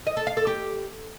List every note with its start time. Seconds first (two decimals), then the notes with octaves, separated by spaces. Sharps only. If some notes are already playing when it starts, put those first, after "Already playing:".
0.07 D#5
0.17 A4
0.27 F5
0.37 A4
0.47 G4